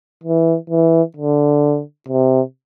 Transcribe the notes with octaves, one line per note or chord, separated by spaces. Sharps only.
E3
E3
D3
C3